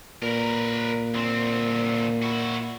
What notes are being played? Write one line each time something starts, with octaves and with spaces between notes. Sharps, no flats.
A#2 A#4 B4
D2 C4
E4 F#4